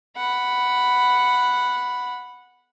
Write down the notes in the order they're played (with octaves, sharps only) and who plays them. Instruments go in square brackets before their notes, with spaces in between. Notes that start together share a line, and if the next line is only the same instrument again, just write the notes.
[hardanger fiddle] F#5 B5